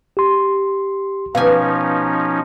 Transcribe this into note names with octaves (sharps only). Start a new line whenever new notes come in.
G4 C6
B2 F3 C#4 D#4 G4 F5 G#5